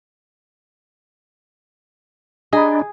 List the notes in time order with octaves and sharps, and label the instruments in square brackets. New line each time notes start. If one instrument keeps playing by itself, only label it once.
[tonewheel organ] D4 [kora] G#4 [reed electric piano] D#5 A#5 B5